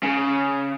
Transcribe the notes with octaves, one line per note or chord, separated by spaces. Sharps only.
C#3